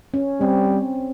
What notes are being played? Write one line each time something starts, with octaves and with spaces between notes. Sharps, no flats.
C#4
G3 C4